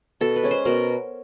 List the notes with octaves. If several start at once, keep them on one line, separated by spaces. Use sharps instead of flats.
B2 A4
B4
G#3 C#4
C5
B2 A#4